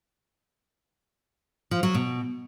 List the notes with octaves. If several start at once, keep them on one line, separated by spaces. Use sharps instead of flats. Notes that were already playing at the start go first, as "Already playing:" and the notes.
F3
F#3
B2